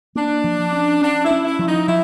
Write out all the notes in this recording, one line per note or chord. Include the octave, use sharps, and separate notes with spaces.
A#3 D4
F3
C#4
C#4 D4
E4
C#4
E4
F3
D#4
F3 E4